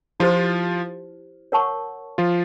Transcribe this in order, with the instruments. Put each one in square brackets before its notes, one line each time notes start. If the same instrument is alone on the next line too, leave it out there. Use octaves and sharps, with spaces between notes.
[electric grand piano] F3 F4 [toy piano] E4 G4 C5
[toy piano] A#4 C#5 F#5 A5 C#6
[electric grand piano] F3 F4